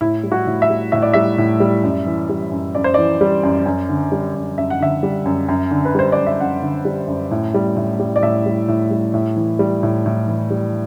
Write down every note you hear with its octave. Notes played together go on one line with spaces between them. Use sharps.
A2 E4
G3
F#4
A2
E5
G3
A2 E5
D5
G3 E5
A2
G3
F#2
E3
G3
F#2
F#2 D5
C5
E3 D5
G3
F#2
F#2
D3
G3
F#2
F#2 E5
F#5
D3 E5
G3
F#2
F#2
D3
B4
G3 C5
F#2 D5
E5
F#2 F#5
D3
G3
F#2
A2
G3
A2
G3
D5
A2 E5
G3
A2
G3
A2
E3
G3
A2
A2
E3
G3